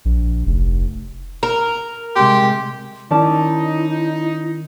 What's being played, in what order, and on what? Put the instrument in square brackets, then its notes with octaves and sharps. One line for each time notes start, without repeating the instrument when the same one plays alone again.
[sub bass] A#1
F1
[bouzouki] A#4
[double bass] C3 G#3 [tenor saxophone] G4 [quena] C6
[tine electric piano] D#3 [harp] C#4 D5 A5 [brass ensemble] D#4 [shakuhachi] E4